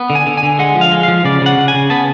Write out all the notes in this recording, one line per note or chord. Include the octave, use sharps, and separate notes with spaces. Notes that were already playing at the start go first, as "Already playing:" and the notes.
Already playing: B3
D3
G#5
D3
G#5
D3
G#3 F#5
F3
F5
G#3
F3 F5
C#3 D5
C#3 F#5
C#3
G#5
C#3
B3 A5